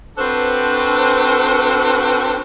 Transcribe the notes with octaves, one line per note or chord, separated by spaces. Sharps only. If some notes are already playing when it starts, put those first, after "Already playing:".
C4 D4 F#4 A4 B4 C5